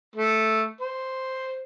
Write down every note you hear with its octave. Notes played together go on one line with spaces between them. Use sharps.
A3
C5